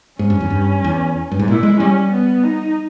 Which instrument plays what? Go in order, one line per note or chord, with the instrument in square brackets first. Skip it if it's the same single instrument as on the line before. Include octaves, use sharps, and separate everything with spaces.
[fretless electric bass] G#2 [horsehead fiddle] C#4
[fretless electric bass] G2
E2
G2
E2
G2
G#2
[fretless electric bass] A#2 [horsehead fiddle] E4
[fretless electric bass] G#3
[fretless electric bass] G3 [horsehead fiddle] C#4
[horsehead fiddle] B3
D#4